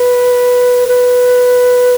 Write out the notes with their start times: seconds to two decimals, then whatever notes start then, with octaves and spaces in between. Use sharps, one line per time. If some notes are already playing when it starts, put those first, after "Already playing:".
Already playing: B4
0.88 B4